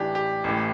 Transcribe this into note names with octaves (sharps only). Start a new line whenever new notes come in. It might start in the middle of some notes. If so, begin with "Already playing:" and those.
Already playing: A1 A2 E3 D4 G4
G4
A1 A2 E3